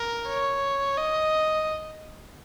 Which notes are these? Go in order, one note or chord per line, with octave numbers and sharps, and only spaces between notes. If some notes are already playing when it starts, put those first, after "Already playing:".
Already playing: A#4
C#5
D#5